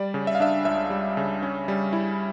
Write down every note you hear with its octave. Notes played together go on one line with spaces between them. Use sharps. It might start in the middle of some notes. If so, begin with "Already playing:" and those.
Already playing: G3 D5
C#3
E5
F5
D4 E5
C#2 E5
G3
C#3
C#4
G3
E4